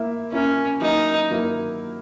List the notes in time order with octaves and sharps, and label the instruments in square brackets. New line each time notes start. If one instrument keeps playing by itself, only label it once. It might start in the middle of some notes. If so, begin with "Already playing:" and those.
Already playing: [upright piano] A#3 E4 A#4 E5
[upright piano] A#3 E4 A#4 E5 [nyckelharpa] C#4
[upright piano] F#3 A#3 E4 A#4 [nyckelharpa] D#4
[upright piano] F#3 A#3 E4 A#4